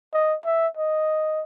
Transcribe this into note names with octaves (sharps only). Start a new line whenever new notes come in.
D#5
E5
D#5